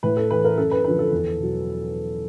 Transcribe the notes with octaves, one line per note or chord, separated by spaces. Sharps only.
A2 B4
A4
E3 B4
A#4
F#2 A4
B4
D3 F3 B4
A4
E2
B2 F#3